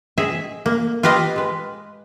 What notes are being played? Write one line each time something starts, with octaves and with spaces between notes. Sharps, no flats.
G#4 D#5 E5
A#3
F4 G4 B4 D#5 F5
G#3 B4